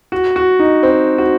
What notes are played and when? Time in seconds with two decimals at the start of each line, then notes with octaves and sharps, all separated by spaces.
0.12 F#4
0.36 F#4
0.59 D#4
0.83 C4
1.18 F#4